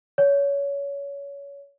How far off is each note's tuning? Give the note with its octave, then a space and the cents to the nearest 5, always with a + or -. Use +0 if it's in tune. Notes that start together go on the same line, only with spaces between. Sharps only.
C#5 +25